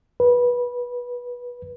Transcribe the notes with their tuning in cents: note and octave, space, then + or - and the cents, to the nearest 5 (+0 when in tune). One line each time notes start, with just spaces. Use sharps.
B4 -20